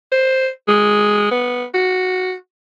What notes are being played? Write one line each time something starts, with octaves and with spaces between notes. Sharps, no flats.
C5
G#3
B3
F#4